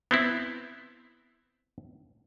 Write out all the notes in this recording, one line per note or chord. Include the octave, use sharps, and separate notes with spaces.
B3 C4 E4